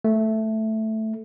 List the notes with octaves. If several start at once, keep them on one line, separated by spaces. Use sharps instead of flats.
A3